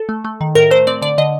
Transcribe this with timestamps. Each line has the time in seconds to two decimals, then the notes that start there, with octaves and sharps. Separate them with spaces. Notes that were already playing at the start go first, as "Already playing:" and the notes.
Already playing: A4
0.09 A3
0.25 A3
0.41 D#3
0.55 A2 A#4
0.71 A3 C5
0.87 C4 D5
1.02 D3 D5
1.18 D3 D#5